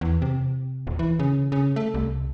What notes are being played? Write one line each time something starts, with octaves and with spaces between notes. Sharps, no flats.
E2
C3
D#1
E3
C#3
C#3
A3
C2